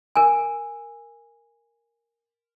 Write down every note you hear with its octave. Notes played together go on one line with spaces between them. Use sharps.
A#4 G#5